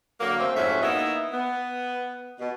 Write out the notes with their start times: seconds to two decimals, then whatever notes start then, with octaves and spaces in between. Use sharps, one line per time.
0.20 D3 F#3 A#3
0.40 A3 C4
0.55 F2 G#2 C#4 F#4 E5
0.82 A#3 B3 D#4 E4
1.32 B3
2.39 B2